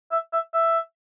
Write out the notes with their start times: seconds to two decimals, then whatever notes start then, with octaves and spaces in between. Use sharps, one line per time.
0.12 E5
0.33 E5
0.54 E5